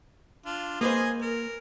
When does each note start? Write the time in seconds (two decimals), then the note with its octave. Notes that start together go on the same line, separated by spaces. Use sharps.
0.46 D4 F4
0.81 A#3 G#4 B4 C5 D#5 G#5
1.22 A#4